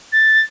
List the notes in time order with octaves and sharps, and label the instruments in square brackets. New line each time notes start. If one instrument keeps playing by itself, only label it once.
[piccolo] A6